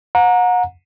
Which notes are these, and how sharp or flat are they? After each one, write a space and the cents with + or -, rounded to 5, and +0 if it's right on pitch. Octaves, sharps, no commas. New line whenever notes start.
F#5 -35 A#5 +0